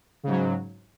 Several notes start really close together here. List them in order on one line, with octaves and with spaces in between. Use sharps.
C#3 G#2 F#3